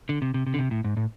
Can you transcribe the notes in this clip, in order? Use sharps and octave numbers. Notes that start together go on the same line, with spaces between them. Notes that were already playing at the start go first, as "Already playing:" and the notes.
D3
C3
C3
C3
D3
C3
A2
G#2
A2